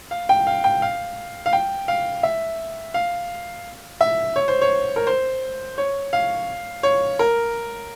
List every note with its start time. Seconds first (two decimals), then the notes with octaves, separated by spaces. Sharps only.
0.11 F5
0.29 G5
0.47 F5
0.64 G5
0.82 F5
1.46 F5
1.53 G5
1.88 F5
2.23 E5
2.94 F5
4.01 E5
4.36 C#5
4.48 C5
4.62 C#5
4.96 A#4
5.07 C5
5.78 C#5
6.13 F5
6.83 C#5
7.19 A#4